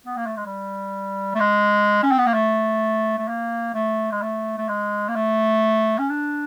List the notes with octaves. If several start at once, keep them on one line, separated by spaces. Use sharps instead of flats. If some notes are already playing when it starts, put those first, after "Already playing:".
B3
A#3
A3
G#3
G3
A3
G#3
C#4
C4
B3
A#3
A3
A3
A#3
A3
G#3
A3
A3
G#3
A#3
A3
C#4
D4